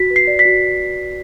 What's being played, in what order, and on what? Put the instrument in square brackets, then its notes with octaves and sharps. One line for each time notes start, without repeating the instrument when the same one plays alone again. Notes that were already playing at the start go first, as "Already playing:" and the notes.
Already playing: [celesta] F#4 B6
B4
C7
D5
B6
F#4